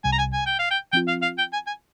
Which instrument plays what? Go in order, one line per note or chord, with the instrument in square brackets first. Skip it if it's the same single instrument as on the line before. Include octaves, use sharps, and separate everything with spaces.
[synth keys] C2 C3 G3 [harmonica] G#5
[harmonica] A#5
G#5
G#5
G5
F5
G5
[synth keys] F3 C4 F4 [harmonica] G5
[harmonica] F5
F5
G5
G#5
G#5